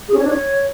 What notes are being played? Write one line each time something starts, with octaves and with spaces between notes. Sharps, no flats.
G#4
C#4
C#5
D4
C#5